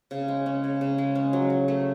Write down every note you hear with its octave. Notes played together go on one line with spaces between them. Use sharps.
C#3
G#3
C#4
C#3
C#3
G#3
C#4
F#3
F#3
A3